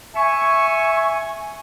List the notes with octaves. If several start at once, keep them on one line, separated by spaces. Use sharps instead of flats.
E5 G#5 C#6